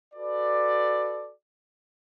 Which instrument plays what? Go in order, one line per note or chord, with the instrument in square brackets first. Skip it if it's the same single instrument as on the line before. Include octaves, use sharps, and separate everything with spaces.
[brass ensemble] F#4 A4 B4 D5